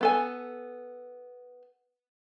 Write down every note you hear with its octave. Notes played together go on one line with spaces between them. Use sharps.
B3 A4 G#5